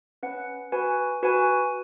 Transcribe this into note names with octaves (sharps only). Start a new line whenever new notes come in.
C#4 B4 F#5
F#4 B4 G#5
F#4 B4 G#5